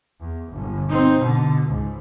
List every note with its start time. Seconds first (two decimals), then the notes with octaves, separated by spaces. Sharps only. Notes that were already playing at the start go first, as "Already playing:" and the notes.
0.20 E2
0.51 G1
0.89 C4 D#4
1.20 B2 D3
1.65 C#2 G#2